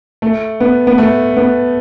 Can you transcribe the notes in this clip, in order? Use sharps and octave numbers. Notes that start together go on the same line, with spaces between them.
A3
B3
B3
A3
B3